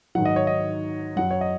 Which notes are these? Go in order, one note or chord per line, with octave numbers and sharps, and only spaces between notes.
G#2 D#3 F#3 F#5
D#5
C#5
D#5
F#2 F#3 F#5
C#5
D#5